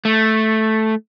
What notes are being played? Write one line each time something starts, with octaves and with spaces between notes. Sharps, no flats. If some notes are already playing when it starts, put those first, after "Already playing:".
A3